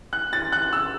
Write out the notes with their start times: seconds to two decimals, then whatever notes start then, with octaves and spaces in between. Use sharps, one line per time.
0.13 F#6
0.33 A6
0.52 F#6
0.73 E6